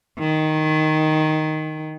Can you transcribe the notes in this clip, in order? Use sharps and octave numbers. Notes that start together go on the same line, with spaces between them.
D#3